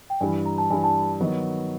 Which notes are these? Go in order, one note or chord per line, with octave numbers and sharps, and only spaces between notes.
G5
G2 E3 G3 G#5
A#5
A5
G2 E3 G3 G#5
A5
D#3 F#3 B3